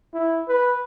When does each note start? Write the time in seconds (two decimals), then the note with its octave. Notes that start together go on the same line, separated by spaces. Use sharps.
0.13 E4
0.48 B4